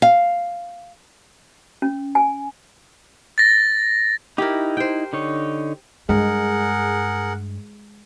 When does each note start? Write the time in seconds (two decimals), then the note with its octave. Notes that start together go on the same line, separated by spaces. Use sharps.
0.02 F5
1.82 C#4
2.15 G#5
3.38 A6 A#6
4.38 D#4 E4 G4 A#4
4.77 C5 G5
5.13 D3 D#4 C#5
6.09 G2 G#3 D4 G#4 A#4 F#5